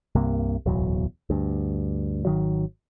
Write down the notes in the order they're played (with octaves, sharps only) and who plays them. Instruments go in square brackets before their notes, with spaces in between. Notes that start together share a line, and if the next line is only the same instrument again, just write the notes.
[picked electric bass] C2 G2 C3 A#3
D1 B1 E2 F#3
D2 G2
G#1 D#3 F#3